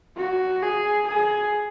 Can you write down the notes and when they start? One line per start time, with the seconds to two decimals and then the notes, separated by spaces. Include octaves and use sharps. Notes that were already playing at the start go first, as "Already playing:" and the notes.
0.17 F#4
0.62 G#4
1.07 G#4